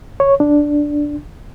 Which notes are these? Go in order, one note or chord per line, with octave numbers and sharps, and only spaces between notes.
C#5
D4